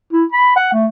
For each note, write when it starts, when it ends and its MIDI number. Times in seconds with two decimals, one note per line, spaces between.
0.13 0.25 64
0.32 0.56 83
0.56 0.68 78
0.72 0.87 57